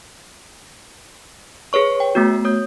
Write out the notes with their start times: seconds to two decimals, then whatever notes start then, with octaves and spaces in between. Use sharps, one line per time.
1.73 G#4 B4 C#5 C#6
2.00 G5
2.15 A3 B3 F#4
2.45 C#5 D#6 G6